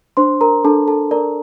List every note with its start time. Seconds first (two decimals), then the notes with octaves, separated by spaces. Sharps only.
0.17 D4 C5 C6
0.41 A#4 A#5
0.64 D4 A4 A5
0.87 A4 A5
1.11 A#4 D5 A#5